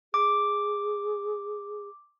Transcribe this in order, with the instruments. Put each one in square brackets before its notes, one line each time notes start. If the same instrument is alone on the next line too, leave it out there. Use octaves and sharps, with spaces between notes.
[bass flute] G#4 [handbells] D6